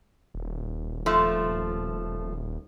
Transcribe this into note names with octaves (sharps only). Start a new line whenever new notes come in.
D#1
F3 A3